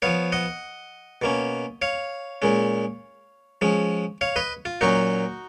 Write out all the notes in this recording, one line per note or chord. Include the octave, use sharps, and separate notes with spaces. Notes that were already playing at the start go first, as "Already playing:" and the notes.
F3 B3 C#5 F5
D#5 F#5
B2 A#3 C#4
C#5 F5
A#2 G#3 C#4
F3 G#3 C#4
C#5 F5
B4 D#5
F4
A#2 F#3 C#4 D#4 F#4